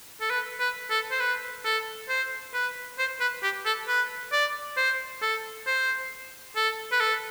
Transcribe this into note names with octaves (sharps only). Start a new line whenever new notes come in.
A4
B4
B4
A4
C5
B4
A4
C5
B4
C5
B4
G4
A4
B4
D5
C5
A4
C5
A4
B4
A4